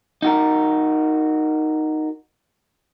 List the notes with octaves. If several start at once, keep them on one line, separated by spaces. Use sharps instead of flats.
D#4 F#4 A#4